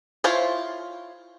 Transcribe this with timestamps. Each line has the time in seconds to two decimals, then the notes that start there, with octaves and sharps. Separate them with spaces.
0.24 E4 F4 C5 C#5